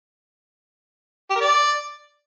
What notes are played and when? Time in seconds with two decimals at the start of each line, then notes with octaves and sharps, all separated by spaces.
1.30 G4
1.35 A#4
1.40 D5